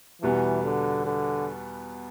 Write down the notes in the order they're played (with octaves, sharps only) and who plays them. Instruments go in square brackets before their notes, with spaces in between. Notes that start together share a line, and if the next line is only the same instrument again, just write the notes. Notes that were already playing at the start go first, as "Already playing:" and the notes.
[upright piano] E2 B2 G3 B3 [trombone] E3
[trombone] D3
D3